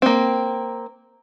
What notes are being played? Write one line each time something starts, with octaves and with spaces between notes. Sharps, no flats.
A#3 C4